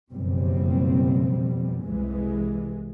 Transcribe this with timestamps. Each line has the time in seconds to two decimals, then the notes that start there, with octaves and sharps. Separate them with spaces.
0.11 F#1 F2 B2 G3 C4
1.82 C2 E3 G#3